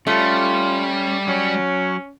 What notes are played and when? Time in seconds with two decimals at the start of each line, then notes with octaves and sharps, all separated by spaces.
0.07 G3 A3 C#4 F4
1.28 F#3 C#4